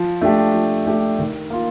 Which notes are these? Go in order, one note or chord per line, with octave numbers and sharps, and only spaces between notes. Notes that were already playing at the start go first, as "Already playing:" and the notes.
Already playing: F3
A3 D4 G4
F3
A3 D4 G4
D#3
A#3 F4